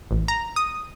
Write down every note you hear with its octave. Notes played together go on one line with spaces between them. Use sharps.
A1
A#5
D#6